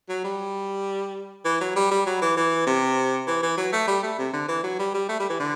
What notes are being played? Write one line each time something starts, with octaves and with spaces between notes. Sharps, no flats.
F#3
G3
E3
F#3
G3
G3
F#3
E3
E3
C3
E3
E3
F#3
A3
G3
A3
C3
D3
E3
F#3
G3
G3
A3
G3
E3
D3